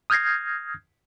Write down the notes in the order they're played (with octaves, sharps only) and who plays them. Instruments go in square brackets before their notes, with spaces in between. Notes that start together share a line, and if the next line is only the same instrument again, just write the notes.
[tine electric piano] D#6 F6 G6 G#6 A#6 C7